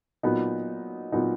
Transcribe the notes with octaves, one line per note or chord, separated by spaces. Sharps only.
A#2 F#3 B3 D#4
A#2 F#3 B3 D#4